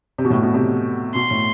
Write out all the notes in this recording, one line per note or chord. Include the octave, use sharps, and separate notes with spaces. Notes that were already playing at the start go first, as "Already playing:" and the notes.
C3
B2
A2
B2
C3
B2 C6
A2